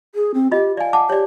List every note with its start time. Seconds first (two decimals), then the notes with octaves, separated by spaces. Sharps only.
0.15 G#4
0.34 C4
0.51 F4 G4 D#5
0.77 D5 F5 G#5
0.93 F#5 A5 D6
1.10 G4 C#5 D5